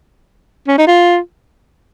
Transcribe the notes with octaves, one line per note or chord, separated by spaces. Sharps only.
C#4
D#4
F4